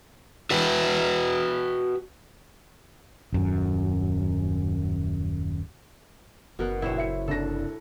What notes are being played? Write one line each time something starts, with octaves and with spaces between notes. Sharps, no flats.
F#4 B4 G5
D#1 F#2
F#1 B2 A#4 F#5
A#1 E4 C5 C#5
E5 C#7
C2 D4 A4 A#6